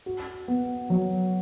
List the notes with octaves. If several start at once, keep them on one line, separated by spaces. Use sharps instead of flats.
F#4
B3
F#3